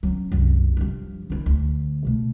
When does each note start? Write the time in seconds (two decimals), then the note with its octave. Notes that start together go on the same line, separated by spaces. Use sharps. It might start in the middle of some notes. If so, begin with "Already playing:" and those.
0.03 F#3 C#4
0.32 C2 F#2
0.77 G2 F3
1.30 D#3 E4
1.46 D2
2.05 B2 A3